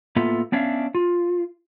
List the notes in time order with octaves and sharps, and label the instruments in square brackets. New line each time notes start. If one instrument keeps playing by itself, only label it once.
[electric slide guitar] A2 A#3 B3 F4 A4 E5
B3 C#4 D4 C#5 E5 F5
F4